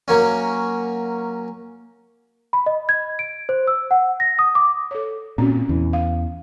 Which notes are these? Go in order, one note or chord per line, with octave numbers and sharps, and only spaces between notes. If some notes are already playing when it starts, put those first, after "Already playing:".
F#3 A#3 C#4
B5
D#5
G#6
D7
C5
E6
F#5
A#6
D#6
D6
A4 C#5
A#2 C4 C#4 F#4
E2 E3
F5